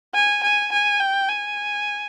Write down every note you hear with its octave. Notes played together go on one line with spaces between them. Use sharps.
G#5
G#5
G#5
G5
G#5